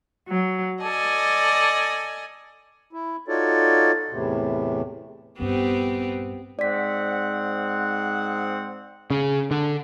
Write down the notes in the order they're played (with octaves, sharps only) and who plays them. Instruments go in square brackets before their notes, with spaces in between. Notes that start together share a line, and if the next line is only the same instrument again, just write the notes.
[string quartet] F#3
A4 D5 D#5 G#5
[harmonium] E4
D#4 F4 F#4 A4 C#5 D5
E2 A2 C3
[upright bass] A#1 G2 [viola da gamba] B3 C4 G4
[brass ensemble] G#2 C4 F#5 [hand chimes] D5 B6
[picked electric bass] C#3
D3